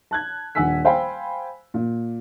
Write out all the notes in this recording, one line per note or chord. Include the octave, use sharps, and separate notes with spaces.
A5 F#6 G#6
D#1 D4 F#5 G#5 E6 B6
C5 F5 G5 G#5 B5
A#2